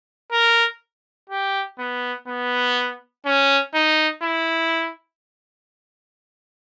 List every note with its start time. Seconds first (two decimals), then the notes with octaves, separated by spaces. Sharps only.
0.32 A#4
1.30 G4
1.79 B3
2.28 B3
3.26 C#4
3.74 D#4
4.23 E4